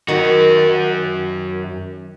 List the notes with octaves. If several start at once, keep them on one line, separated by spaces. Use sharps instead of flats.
F#2 D#3 F#4